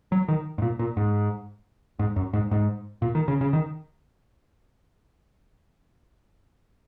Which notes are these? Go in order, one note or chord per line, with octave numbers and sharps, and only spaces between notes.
F#3
D#3
G#2
A#2
A#2
G#2
G#2
F#2
G#2
G#2
A#2
D#3
C#3
C#3
D#3